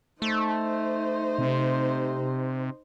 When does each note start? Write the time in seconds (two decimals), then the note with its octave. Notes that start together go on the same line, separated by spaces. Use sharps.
0.22 A3 D#4 C5
1.39 C3